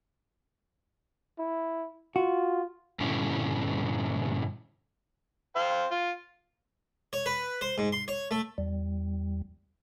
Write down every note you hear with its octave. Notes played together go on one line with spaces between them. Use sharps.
E4
F4 F#4
G2 A#2 D3 C#4 E4
C5 F5 G5
F4
C#5
B4
C5
G#2
C6
C#5
A3
E2 G3